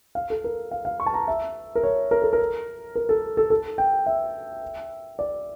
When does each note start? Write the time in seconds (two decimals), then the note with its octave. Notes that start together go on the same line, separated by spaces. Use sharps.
0.15 F5
0.30 A4
0.44 A#4
0.71 F5
0.85 F5
1.00 C#6
1.06 A5
1.14 A#5
1.28 E5
1.75 A#4
1.83 C#5
2.11 A#4
2.22 A4
2.33 A#4
2.95 A#4
3.09 A4
3.37 A4
3.50 A4
3.78 G5
4.06 E5
5.19 D5